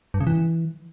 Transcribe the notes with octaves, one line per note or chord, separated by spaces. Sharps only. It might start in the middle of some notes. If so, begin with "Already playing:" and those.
G2
C#3
E3